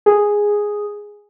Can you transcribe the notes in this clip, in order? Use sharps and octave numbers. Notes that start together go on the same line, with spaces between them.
G#4